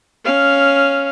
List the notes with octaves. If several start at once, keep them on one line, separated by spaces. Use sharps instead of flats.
C#4 F5